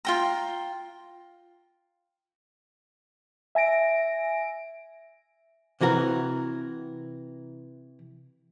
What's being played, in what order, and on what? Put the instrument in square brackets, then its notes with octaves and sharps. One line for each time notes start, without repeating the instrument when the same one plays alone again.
[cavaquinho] F4 G5 A#5
[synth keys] E5 G#5 A#6 D7
[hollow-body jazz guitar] C3 E3 F#4 A#4